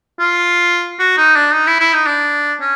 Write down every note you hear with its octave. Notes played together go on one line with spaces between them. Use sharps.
F4
F#4
D#4
D4
D#4
E4
E4
D#4
D4
C#4